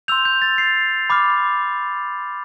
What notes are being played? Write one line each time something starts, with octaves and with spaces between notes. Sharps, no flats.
C6 E6 G6 F7
G6
A6
C7
B5 D6 F6